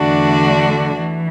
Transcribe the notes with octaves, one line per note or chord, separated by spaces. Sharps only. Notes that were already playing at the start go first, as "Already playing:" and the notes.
Already playing: E2 D3 A3 D4 F#4
E3